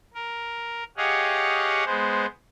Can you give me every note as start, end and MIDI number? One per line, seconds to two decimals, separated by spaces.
0.14 0.84 70
0.97 1.84 67
0.97 1.84 68
0.97 1.84 73
0.97 1.84 75
0.97 1.84 77
0.97 1.84 78
1.86 2.26 56
1.86 2.26 59
1.86 2.26 72